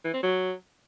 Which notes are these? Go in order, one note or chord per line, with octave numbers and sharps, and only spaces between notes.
E3
C4
F#3